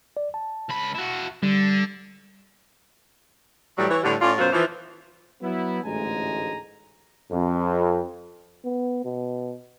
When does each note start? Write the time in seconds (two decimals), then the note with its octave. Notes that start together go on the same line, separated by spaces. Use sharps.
0.17 D5
0.34 A5
0.69 C#2 B5
0.95 E4 F#4
1.43 D3 G3
3.78 A2 E3 F#3 G3
3.90 E3 C#5
4.03 A2 D3 G3
4.21 A2 C#4 F4 D5
4.38 F#2 B2 F#3 F4 F#4 C5
4.52 E3 F3
5.42 F#3 B3 E4
5.84 A1 D2 G#2 G#3 G#5 A#5
7.30 F2
8.64 B3
9.04 B2